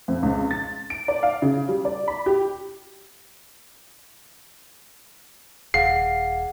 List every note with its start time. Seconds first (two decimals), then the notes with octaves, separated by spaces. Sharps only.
0.08 F2
0.23 C#2
0.51 A6
0.90 D7
1.08 D5
1.23 F5
1.42 C#3
1.69 G3
1.85 D5
2.08 B5
2.26 G4
5.74 D#1 G#4 F5 F#5 C7